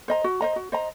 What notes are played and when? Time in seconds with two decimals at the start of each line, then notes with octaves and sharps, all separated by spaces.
0.08 C5 D#5 A#5
0.24 F#4
0.41 C5 D#5 A#5
0.56 F#4
0.72 C5 D#5 A#5